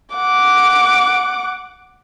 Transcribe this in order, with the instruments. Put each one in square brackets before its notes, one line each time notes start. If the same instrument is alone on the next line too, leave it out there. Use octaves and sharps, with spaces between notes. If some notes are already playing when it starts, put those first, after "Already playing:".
[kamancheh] F#5 D6